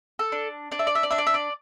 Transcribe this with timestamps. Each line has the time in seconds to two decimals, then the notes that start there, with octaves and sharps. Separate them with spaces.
0.19 A4
0.32 D4
0.72 D4 D5
0.79 E5
0.87 D5
0.95 E5
1.03 D5
1.11 D4 E5
1.18 D5
1.27 E5
1.34 D5